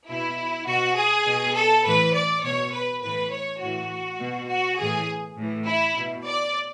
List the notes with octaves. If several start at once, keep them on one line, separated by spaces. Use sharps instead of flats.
B2 E4
B2 F#4
G#4
B2
A4
A2 E3 B4
D5
B2 C#5
B4
A2 E3 B4
C#5
A2 E3 F#4
B2
F#4
A2 E3 G#4
A2 E3
E4
B2
D5